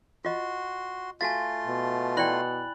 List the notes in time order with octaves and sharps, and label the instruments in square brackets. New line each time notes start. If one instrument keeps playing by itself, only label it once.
[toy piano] F4 D#5 [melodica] F#4 C6
[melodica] A3 F4 C6 [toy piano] F#4 F5 [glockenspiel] G#5 A6
[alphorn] B2
[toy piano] E4 D5 G5 [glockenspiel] B5 F#6 F#7